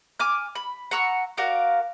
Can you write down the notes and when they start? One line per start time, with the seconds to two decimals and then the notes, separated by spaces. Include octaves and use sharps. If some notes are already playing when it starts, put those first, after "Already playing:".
0.20 G#5 D6 F6
0.55 B5
0.91 F#5 A#5 C#6 E6
1.37 F#4 A#4 D5 F5